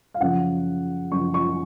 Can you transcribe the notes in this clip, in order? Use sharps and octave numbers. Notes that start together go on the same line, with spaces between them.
F5
F#2 C#3 F3 F#5
F#2 C#3 F3 C#6
C#6